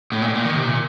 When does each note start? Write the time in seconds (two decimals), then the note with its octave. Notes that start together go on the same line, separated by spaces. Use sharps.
0.12 A2
0.22 A#2
0.28 A2
0.34 A#2
0.45 D#3
0.55 C3
0.66 A#2